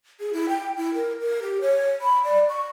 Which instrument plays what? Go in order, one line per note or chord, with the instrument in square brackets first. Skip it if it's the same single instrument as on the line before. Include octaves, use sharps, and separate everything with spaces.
[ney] G#4
E4
G5
E4
A#4
A#4
G4
C#5
B5
D5
C#6